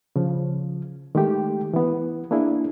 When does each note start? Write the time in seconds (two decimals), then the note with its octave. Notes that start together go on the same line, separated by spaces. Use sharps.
0.16 C#3 F3
1.15 D#3 G#3 A3 G4
1.74 E3 B3
2.31 A#3 D4 E4 G#4